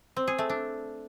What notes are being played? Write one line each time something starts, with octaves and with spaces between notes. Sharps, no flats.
C4
G#4
A3
D4